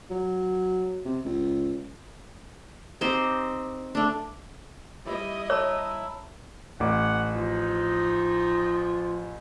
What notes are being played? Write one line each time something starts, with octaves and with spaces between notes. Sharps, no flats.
F#3
C3
C#2
C4 D#4 G4 C5
A3 D4
G3 E4 D#5
C#5 A5 A#5 E6
A1 F#5 D6
F3 D#4